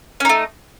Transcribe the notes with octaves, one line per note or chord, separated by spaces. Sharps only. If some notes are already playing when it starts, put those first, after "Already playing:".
A3 C#4 D#4